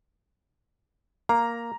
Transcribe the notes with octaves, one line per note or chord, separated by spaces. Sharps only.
A#3 A#5